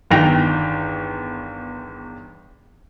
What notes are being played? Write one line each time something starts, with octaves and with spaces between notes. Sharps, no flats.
G1 E2 D#3 G5 A#6 F7